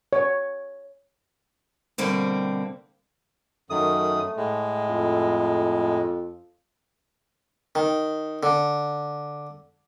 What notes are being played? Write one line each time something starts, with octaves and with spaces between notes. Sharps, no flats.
C#5
B2 D3 G3 A#3 C4
F#2 D#3 A3 D#6
A2 G#3
F2
D#3
D3